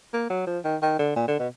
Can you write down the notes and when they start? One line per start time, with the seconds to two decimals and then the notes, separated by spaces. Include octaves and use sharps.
0.13 A#3
0.30 F#3
0.47 F3
0.64 D#3
0.82 D#3
0.99 D3
1.16 A#2
1.28 D3
1.39 B2